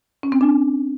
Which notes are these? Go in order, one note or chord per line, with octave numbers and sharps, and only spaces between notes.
C#4
C4
D4